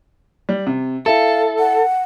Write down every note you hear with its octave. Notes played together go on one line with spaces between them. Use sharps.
G3
C3
E4 A4 F5
F#5